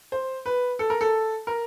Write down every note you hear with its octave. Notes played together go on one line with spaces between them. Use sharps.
C5
B4
A4
A#4
A4
A#4